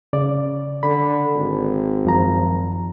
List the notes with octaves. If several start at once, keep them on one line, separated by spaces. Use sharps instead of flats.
C#3 D5
D3 B5
G#1
F#2 F3 A#5